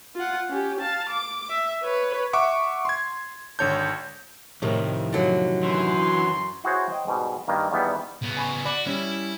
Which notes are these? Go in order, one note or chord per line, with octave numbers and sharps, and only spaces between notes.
F4 F#5
C#4 G4
F5 A5
D6
E5
B4 C#5
E5 F#5 C#6 D6
C6 G#6
G#1 D3 C#5 A5 G6
F2 A2 C3 D#3
D3 F#3
F#2 E3 C6
E4 F#4 G#4 C5 C#5
C5 D#5 G5
G#2 B2 G3
G2 D#3 A#3
E2 D#3 G3 B3
C#3 B3
G#5 B5 C#6
F#4 D5 B5 D6
G3 C#4 E4